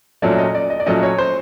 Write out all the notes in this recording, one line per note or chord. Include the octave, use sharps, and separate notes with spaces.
A#2 F#3 A3 C#4 D5
D#5
D5
D#5
D5
A#2 F#3 A3 C#4 D#5
C#5
C5